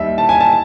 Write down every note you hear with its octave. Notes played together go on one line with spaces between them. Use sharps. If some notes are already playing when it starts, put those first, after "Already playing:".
Already playing: D#2 D#3 G3 E5
A5
G#5
A5